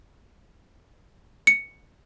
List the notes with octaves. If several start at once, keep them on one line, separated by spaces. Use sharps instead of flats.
C#7